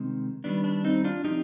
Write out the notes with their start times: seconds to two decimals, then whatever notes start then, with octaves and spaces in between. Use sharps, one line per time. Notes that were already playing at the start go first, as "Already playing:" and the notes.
Already playing: C3 D#3 G#3 C4
0.44 D#3 G3 B3 D4
0.64 D4
0.84 C4 D#4
1.04 D4 F4
1.24 D3 F3 C4 D#4 G4